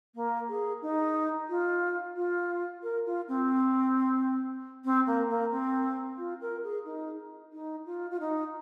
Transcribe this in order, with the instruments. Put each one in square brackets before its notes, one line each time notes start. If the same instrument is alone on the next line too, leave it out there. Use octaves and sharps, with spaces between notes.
[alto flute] A#3
G#4
D#4
F4
F4
A#4
F4
C4
C4
A#3
A#3
C4
F4
A#4
G#4
D#4
D#4
F4
F4
D#4